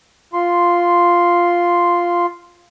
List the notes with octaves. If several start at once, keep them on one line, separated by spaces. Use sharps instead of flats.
F4 C6